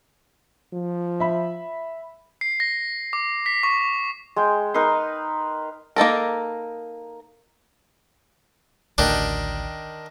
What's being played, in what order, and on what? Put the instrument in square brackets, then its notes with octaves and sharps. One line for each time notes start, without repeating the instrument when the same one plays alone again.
[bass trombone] F3
[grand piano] E5 B5
[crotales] C7
A#6
D6
B6
C#6
[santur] G#3 G5
D#4 A#4 B4 C6
[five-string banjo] A#3 D#4 A4 A#4
[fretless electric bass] A1 D2 [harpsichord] D#3 D4